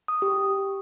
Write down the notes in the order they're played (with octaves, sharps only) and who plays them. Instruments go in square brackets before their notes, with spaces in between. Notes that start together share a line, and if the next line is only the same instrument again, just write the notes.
[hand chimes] D#6
G4